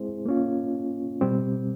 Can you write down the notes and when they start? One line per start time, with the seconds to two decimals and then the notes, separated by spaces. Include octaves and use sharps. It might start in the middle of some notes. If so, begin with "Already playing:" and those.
Already playing: G#3 C4 E4 G#4 C5
0.26 A#3 C#4 F4
1.21 B2 G3 C4